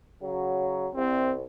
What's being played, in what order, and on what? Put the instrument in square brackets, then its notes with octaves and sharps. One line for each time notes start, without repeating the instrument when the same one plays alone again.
[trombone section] C#3 F#3
[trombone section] C2 [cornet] C4